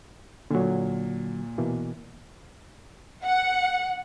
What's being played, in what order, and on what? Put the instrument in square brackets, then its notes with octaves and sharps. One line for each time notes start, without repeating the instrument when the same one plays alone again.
[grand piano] A#2 [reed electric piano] D3 F#3
[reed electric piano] B2 E3 A#3
[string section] F#5